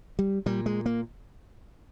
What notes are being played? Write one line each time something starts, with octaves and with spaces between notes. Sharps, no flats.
G3
A#2 G3
G#3
A#3